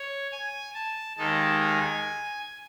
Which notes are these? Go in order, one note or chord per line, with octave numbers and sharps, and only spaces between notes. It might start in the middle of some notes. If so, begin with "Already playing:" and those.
Already playing: C#5
G#5
A5
D#2 D#3 G#3 D#4 A5
G#5